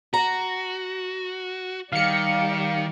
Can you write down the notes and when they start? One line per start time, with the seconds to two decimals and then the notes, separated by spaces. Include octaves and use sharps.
0.14 F#4 A#5
1.92 D#3 G3 G4 D5 F5 C#7